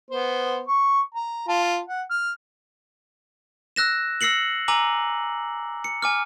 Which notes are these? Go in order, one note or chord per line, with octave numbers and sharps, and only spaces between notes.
B3 C5
C#6
A#5
F4 A5
F#5
F6
E6 F#6 A#6 E7
E6 A#6 C7 C#7 F#7
G#5 A#5 D6 E6 F#7
C#7
G#5 D6 F6